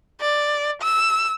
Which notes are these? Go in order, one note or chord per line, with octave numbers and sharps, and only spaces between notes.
D5
E6